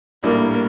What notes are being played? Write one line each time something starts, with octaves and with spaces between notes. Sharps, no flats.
A#1 A2 G3 A#3 D4